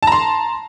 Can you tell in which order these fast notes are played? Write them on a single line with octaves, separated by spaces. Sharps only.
A5 A#5 C6